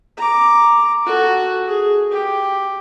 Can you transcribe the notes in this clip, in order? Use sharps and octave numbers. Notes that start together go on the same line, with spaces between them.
A#5 D6
F#4 A4
G#4
G4